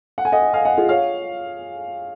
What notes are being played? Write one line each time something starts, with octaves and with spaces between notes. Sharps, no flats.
F#5
G#5
D#5 F#5
F5 G#5
D#5 F#5
F4 G#4
C#5 F5